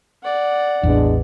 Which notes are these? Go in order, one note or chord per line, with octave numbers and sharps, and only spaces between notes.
D5 F#5
A1 E2 G#3 B3 D4